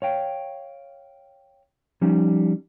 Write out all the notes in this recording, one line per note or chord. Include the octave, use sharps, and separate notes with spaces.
C#5 F5 G5
F3 G3 C#4 D#4